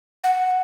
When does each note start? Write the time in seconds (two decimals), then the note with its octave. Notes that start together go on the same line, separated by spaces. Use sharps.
0.24 F#5